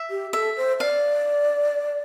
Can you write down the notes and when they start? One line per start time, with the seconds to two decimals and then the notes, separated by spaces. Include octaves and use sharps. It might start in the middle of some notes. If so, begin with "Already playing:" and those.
Already playing: E5
0.10 G4
0.33 A4 E5
0.57 C5
0.80 D5 F5